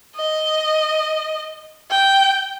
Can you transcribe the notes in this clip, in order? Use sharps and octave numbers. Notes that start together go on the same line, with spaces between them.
D#5
G5